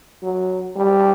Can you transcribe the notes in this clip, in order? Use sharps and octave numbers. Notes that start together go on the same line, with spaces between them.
F#3
G3